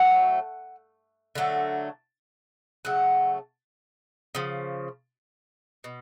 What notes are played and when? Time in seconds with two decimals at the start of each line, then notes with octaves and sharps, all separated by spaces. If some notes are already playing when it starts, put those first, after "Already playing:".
Already playing: A2 F#3 A3 F#5
1.35 D3 F#3 A3
2.85 C#3 F#3 A3 F#5
4.35 C#3 F3
5.84 B2